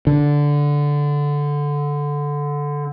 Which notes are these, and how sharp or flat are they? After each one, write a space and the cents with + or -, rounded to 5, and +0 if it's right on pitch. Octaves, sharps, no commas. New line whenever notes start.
D3 -10